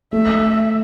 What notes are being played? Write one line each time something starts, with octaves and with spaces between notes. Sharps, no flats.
A3 E5